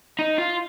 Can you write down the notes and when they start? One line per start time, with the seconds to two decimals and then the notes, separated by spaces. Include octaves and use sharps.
0.19 D#4
0.38 F4